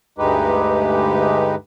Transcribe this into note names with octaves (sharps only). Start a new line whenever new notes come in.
D2 G2 G#3 D#4 G4 B4